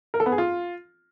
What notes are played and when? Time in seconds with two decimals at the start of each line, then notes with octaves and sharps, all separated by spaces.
0.14 A#4
0.20 A4
0.26 B3
0.32 G#4
0.38 F4